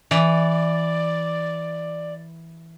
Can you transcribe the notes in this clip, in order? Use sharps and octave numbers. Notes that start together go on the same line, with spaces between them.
E3 D5